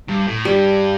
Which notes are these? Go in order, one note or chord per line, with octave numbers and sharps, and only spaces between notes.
G2
A2
G2 G3